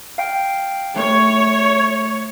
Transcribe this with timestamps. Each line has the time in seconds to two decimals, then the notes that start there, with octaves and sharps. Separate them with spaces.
0.18 F5 G5
0.96 A3 C#5